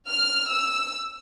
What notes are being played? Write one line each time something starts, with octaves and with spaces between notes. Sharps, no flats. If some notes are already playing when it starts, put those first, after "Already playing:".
F6
E6